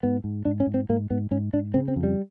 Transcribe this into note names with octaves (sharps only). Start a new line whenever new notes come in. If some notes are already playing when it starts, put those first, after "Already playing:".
G#2 B3
G#2
G#2 D4
C#4
G#2
C4
G#2 A#3
G#2 B3
G#2 C#4
G#2 D4
C#3 C4
C4
F2
G3